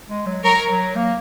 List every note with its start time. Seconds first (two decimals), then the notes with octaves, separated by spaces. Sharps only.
0.09 G#3
0.26 F#3
0.44 F#3 A#4 C#5
0.70 F#3
0.96 A#3